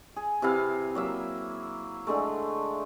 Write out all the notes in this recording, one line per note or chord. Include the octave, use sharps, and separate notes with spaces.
G#4
C3 E4 B4 F5
F#3 A#3 E5
D3 G#3 A3